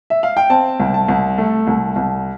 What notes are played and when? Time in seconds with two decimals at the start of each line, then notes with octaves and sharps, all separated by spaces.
0.10 E5
0.23 F5
0.37 G5
0.50 C4 A5
0.80 C2
0.94 A5
1.08 C2
1.38 A3
1.67 C2
1.96 C2